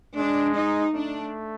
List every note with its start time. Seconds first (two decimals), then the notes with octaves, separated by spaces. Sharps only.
0.17 G#3 D4
0.55 D#4
0.94 A3 D4